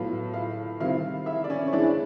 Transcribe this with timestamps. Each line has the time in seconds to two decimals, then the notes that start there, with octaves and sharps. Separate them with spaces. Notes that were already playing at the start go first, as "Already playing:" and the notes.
Already playing: A2 F#3 B3 F4 F5
0.34 F4 F5
0.80 C3 D#3 G3 C4 E4 F4 F5
1.26 E4 E5
1.44 D5
1.50 C#4 C#5
1.68 C#5
1.73 E3 G#3 C4 D4 E4 D5